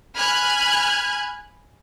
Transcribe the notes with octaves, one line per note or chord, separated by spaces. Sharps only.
G#5 B5 F6 F#6 G#6